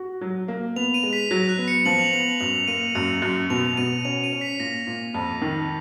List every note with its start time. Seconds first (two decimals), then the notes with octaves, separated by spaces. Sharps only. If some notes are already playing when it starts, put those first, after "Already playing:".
Already playing: F#4
0.21 F#3
0.48 A#3
0.76 B3 F7
0.94 D#7
1.03 G#3
1.13 B6
1.31 F#3 A#6
1.49 F#6
1.58 B3
1.68 C#7
1.85 F3 F#7
1.99 F7
2.13 B3 F#7
2.40 F#2 F7
2.67 A#3 D#7
2.95 F#2 C#7
3.22 F#2
3.50 B2 F7
3.77 B2 D#7
4.05 C#4 F7
4.24 D#7
4.33 C#4
4.41 B6
4.59 A#2 A#6
4.87 A#2
5.14 F2
5.42 D#3